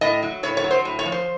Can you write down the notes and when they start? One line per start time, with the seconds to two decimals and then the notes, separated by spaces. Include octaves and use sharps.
0.01 A2 D#5
0.22 F#3
0.43 A2 C#5
0.57 C#5
0.64 F#3
0.71 C5
0.85 A2
0.99 C#5
1.05 F3
1.12 C5